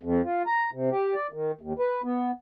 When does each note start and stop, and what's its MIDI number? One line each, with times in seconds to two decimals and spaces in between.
0.03 0.22 41
0.25 0.43 65
0.47 0.70 82
0.73 0.90 48
0.91 1.14 67
1.14 1.27 74
1.32 1.52 51
1.61 1.73 39
1.79 2.02 71
2.04 2.31 59